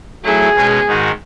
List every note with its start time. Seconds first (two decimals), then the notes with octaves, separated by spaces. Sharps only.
0.24 F#3 A3 E4 G#4
0.55 B2 G#3 C#4
0.86 G#2 D#3 G#3 D#4 F#4